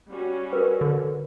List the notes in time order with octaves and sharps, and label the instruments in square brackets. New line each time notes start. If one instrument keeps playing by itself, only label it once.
[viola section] G3 C#4 F#4
[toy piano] A#4 B4
[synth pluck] D3